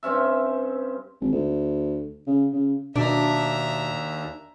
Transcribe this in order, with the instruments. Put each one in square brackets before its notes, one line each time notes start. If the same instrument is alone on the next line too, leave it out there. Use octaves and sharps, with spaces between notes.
[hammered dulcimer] G2 C4 C#4 E5
[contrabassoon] G#1
D2
C#3
C#3
[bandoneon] D#2 [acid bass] B2 [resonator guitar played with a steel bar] D4 [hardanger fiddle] E5 A#5